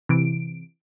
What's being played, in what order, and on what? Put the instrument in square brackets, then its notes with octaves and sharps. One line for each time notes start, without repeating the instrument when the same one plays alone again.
[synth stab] C3 E3 D7